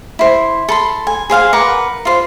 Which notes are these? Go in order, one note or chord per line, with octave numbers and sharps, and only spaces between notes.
E4 C5
A4 B5 C6
G#5
G#4 C5 F5 G#5
A#4 B4 F#5 D6
F4 C5